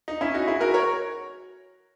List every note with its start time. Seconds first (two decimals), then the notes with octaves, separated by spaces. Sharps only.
0.08 D#4
0.21 C#4 E4
0.34 D#4 F#4
0.47 E4 G#4
0.60 F#4 A#4
0.74 A#4 C#5